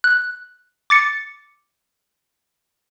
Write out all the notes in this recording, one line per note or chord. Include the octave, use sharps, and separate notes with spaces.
F#6
D6 A6 C#7